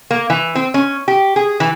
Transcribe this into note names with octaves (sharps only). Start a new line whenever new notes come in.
A#3
E3
C4
C#4
G4
G#4
E3